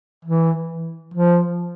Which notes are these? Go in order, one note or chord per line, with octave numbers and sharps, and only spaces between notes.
E3
F3